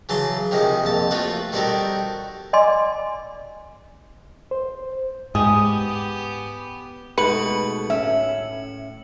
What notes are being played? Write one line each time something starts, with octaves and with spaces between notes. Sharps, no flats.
C#3 E3 F#3 A5 C6
C3 D#3 F3 G#3
A#1 F2 A5
A3 F4 F#4 A4 B4
D#3 G3 C4 F#4 A4 A#4
D5 D#5 G#5 C6 D6
C5
G#2 B3 G4 G#4
B2 G#3 A3 D#4 B4 C#7 F#7
A2 C#4 E5